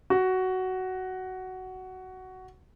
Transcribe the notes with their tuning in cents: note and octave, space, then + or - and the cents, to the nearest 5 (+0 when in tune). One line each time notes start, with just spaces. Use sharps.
F#4 +10